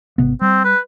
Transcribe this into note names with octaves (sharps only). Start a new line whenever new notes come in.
G#1 C3 B3
G3 C4
B4